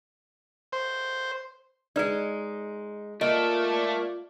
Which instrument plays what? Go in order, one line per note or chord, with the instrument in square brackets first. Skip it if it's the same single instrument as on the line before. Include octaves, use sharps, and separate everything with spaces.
[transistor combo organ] C5
[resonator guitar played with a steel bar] G#3 D#4 [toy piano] B4 D5
[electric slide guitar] A3 A4 [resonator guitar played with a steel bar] A#3 [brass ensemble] F4 D5 [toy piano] D#5